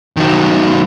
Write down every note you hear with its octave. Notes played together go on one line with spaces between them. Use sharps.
D#3 F#3